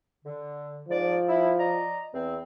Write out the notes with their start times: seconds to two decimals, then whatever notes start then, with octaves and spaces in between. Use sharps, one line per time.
0.24 D3
0.88 G#2 F3 D5
1.28 E4
1.57 D5 D#5 A#5
2.14 E2 C4